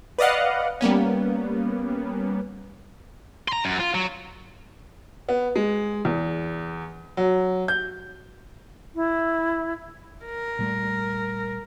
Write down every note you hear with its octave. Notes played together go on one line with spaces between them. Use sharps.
B4 D5 D#5 F5 F#5
G3 A#3 B3 C#4
A#5 C6
F#2
F4
F#3
B3
G#3
E2
F#3
G6
E4
A#4
A#2 G3 A3